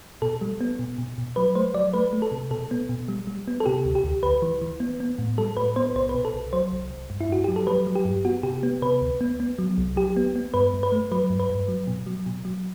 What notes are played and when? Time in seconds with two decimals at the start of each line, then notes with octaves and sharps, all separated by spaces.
0.22 B2 A4
0.41 G3
0.61 B3
0.79 B2
0.98 B2
1.18 B2
1.36 F#3 B4
1.55 A3 C5
1.74 F#3 D5
1.94 A3 B4
2.13 A3
2.22 A4
2.32 C3
2.51 B2 A4
2.71 B3
2.89 B2
3.08 G3
3.27 G3
3.48 B3
3.60 A4
3.66 C3 G4
3.85 D2
3.95 G4
4.04 D2
4.23 D2 B4
4.42 E3
4.62 E3
4.80 B3
5.00 B3
5.19 A2
5.38 G3 A4
5.57 A2 B4
5.76 B3 C5
5.95 C2 C5
6.09 B4
6.14 B2
6.25 A4
6.33 C2
6.53 F#3 C5
6.72 C2
6.90 C2
7.10 G2
7.21 E4
7.29 G2 F#4
7.44 F#3 G4
7.56 A4
7.67 F#3 B4
7.87 F#3
7.96 G4
8.05 G2
8.25 B3 F#4
8.43 C3 G4
8.63 B3
8.82 C3 B4
9.01 D2
9.21 B3
9.40 B3
9.59 F#3
9.78 C2
9.96 F#3 G4
10.17 B3
10.36 B3
10.54 G2 B4
10.74 G2
10.83 B4
10.92 A3
11.12 F#3 B4
11.30 G2
11.40 B4
11.50 G2
11.68 F#3
11.87 B2
12.06 F#3
12.26 B2
12.45 F#3